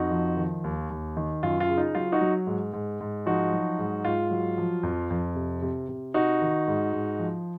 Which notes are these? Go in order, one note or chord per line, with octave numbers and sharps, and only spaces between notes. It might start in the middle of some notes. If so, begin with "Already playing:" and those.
Already playing: F2 D#4 F#4
F3
D#3
D#2
D#2
D#3
F#2 F4
F4
C#3
D#4
F#3 F4
D#4 F#4
F#3
G#2
G#2
G#2
F3 D#4 F#4
F#3
G#2
G#2 F4
F#3
F3
F2
F2
C3
C3
C3
C3 D#4 F#4
D#3
G#2
G#2
F3